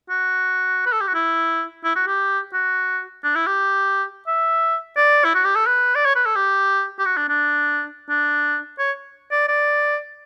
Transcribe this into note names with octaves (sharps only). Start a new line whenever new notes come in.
F#4
B4
A4
G4
F#4
E4
E4
F#4
G4
F#4
D4
E4
G4
E5
D5
E4
F#4
G4
A4
B4
D5
C#5
B4
A4
G4
G4
F#4
D4
D4
D4
C#5
D5
D5